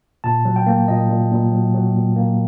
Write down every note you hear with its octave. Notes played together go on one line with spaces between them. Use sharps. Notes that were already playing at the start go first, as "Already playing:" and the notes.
A#2 A5
F#3
G5
A#3
A#2 D#5
A#2
A#2
F#3
F#3
A#2
A#3